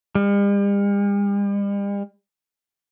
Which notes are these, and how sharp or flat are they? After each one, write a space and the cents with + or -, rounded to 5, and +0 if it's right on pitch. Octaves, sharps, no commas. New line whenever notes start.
G3 +45